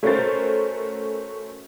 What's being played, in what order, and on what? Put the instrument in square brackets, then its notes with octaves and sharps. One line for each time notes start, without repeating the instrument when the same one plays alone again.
[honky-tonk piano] A3 C#4 F#4 A#4 C5 A6